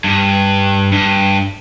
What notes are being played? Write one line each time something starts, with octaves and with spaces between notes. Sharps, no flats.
G2
G2